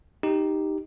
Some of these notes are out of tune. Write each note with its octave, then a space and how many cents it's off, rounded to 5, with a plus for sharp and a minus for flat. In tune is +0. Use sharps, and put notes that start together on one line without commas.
D#4 +0 G4 +0